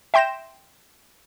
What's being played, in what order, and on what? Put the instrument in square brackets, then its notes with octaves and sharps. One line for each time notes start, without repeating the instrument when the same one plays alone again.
[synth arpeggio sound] E5 G5 C6 G6 A#6 E7